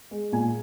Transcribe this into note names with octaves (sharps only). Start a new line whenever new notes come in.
G#3
A#2 G#5